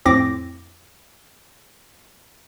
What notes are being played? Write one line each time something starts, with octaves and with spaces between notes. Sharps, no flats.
F2 A2 C4 D6 A#6